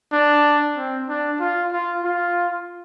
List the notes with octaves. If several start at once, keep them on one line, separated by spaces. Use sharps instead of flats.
D4
C4
D4
F4
F4
F4